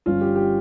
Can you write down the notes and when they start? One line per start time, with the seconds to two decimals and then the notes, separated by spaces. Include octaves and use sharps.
0.06 G1 G2 F3 C#4 F4
0.21 G4
0.36 G4